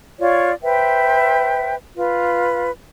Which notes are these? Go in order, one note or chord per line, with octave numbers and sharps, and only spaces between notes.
F4 C#5 D5
B4 C5 E5 G5
F4 B4